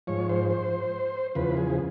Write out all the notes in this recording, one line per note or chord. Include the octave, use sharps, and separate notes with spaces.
G#2 F3 C#5
C5
C5
E2 C#3 F3 B4
G#4